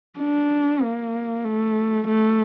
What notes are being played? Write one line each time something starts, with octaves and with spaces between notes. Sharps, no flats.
D4
A#3
A3
A3